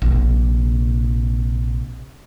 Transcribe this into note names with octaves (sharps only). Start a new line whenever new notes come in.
A#1 C3